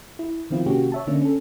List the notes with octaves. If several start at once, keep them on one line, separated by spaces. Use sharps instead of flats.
E4
D#3 F3 C4 E4 F4
C3 D#3 A#3 C#4 F#4 G4
C#5 E5 A5
D3 A#3 C#4 D4
C#4 A4